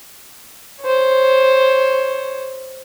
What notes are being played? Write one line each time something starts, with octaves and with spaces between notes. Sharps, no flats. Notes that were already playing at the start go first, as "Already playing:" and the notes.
C5 C#5